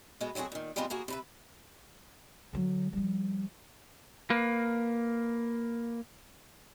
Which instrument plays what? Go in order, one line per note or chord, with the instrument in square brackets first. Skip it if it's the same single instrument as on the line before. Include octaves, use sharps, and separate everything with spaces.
[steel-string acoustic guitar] B2 G#3 A3 B3
F#3 A3 C4 F#4 G#4
A#2 D#3
F3 G3 G#3 B3 C4 F4
D#2 A#3 F#4 G#4
C3 B4 E5
[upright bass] D3 F#3
F3 G3
[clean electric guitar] A#3 B4